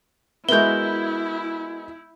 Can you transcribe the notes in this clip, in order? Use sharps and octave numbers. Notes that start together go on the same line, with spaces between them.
G#3 B3 E4 F#4 A#4 E5 G6 G7